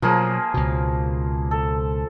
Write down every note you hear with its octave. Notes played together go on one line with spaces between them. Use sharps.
B2 F3 F#3 A#3 G#4
C#2 B2
A4